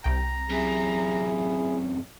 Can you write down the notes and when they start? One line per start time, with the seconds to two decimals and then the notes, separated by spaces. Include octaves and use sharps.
0.04 C2 G5 A#5
0.49 F#2 C3 E4 G#4